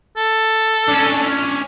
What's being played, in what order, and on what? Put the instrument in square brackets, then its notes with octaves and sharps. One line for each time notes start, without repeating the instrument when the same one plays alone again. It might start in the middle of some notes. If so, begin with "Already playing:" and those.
[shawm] A4
[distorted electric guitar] C#4 D4